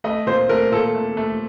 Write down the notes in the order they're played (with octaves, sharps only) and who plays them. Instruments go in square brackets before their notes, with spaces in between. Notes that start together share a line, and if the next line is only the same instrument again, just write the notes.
[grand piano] A3 D#5
A#2 C5
A3 A#4
A#2 A4
A3
A3